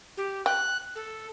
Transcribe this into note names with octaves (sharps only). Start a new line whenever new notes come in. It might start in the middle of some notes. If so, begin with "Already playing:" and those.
G4
G5 F#6
A4